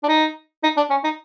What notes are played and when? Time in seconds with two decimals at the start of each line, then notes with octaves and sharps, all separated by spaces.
0.04 D4
0.09 D#4
0.63 D#4
0.77 D4
0.90 C#4
1.04 D#4